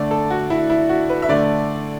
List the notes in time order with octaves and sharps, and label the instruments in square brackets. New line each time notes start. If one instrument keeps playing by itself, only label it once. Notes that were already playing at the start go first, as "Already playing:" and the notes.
Already playing: [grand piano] D3 A3 D5
A4
F#4
E4
E4
F#4
B4
E5
D3 A3 D5